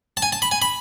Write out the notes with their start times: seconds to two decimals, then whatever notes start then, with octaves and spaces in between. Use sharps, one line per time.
0.17 A5
0.22 G#5
0.32 A5
0.42 B5
0.51 G#5
0.62 B5